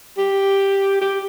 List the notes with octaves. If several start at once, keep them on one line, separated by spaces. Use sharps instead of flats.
G4
G4